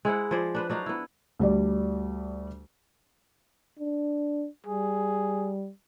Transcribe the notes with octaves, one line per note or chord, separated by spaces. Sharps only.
G#3 E4 C5 F#5
F3 G#4 C5 D5
D4 B4 C5
F#3 D4 D#4 F5
B3 E4
D2 G3 D5
D4
G3 G#4